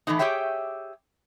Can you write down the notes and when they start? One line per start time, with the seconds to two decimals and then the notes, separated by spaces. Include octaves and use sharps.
0.07 A2 E3 A3 C4 D#4
0.19 G4 G#4 C#5 E5 G5